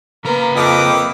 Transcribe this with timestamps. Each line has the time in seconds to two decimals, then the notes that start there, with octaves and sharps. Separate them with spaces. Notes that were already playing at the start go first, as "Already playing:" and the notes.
0.25 C#3 A#3 A#4 B4 A#5
0.56 F2 D#5 G5 D6